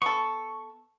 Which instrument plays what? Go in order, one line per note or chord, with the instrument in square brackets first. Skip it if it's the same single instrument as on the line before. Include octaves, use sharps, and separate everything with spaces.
[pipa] B3 A4 [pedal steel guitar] C#6